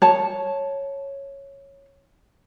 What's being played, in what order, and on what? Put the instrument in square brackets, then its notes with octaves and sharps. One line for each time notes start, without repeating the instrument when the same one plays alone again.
[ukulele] C#5 A5